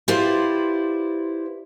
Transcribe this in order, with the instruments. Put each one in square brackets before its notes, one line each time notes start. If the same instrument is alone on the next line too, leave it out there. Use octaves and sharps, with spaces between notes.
[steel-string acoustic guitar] E4 F4 G4 B4 C5 D5